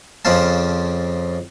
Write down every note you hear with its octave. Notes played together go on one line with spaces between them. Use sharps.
F2 C#3 C4 F5 A5